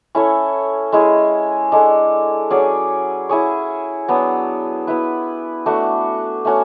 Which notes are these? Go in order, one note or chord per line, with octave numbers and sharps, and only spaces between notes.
C#4 E4 A4 C#5
G#3 C#4 E4 G#4
G#3 D4 A4
F#3 C#4 G#4 D5
E4 G#4 C#5
F#3 B3 D4
B3 E4 B4
A3 D4 F#4
A3 C#4 F#4